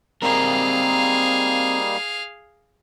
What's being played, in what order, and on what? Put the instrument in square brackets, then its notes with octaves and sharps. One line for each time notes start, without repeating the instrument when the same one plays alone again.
[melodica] G3 A#3 D#4 [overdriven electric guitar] C4 A#4 [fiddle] G#4 F5